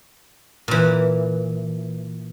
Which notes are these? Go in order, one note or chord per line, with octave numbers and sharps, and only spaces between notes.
A#2 E3